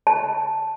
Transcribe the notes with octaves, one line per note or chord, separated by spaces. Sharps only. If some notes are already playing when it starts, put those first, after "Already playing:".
A5